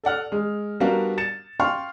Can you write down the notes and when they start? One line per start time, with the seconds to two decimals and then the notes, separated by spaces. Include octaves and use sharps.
0.04 A4 D5 F#5 F6
0.32 G#3
0.80 G3 B3 D4 F#4 A#4 F5
1.18 A6 C#7 E7
1.60 F5 G5 C6 C#6 F6